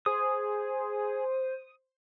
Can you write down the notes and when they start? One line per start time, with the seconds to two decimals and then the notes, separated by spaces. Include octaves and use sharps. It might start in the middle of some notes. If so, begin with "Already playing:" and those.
0.06 G#4 C5 D#6